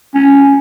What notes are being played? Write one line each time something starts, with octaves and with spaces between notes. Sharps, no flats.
C#4